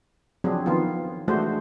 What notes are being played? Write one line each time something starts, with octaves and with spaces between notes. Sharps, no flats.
F3 F#3 C4 D4 G#4
D#3 F3 B3 F4
E3 G#3 A3 D4 F#4 C5